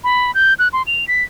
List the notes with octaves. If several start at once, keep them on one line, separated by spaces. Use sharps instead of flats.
B5
G6
F#6
C6
F7
B6